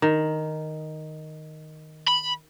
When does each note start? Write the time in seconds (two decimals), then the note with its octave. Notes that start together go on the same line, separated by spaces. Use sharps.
0.02 D#3
2.08 B5